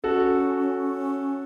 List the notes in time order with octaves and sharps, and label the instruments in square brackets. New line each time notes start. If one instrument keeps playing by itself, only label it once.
[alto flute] C#4 [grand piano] F#4 A4